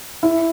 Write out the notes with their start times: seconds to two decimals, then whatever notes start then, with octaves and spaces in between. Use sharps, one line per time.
0.23 E4